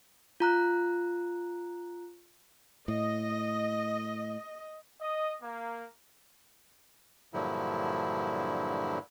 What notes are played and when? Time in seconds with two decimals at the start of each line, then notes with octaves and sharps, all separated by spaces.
0.40 F4 A#5 F#6
2.88 A2 D#5
5.01 D#5
5.41 A#3
7.33 G2 A#2 D3 F3 F#3 E4